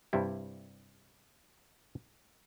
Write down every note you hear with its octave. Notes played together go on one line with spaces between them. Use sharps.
G2 C3 G3 E4